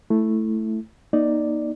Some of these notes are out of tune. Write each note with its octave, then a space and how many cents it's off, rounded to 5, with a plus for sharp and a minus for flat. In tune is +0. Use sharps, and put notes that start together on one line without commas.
A3 +0 E4 +0
A#3 +40 D#4 -5 D5 +0